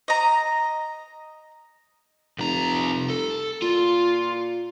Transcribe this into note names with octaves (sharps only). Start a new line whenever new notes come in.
D#5 A#5
F1 C2 A#5
A4
A#2 F4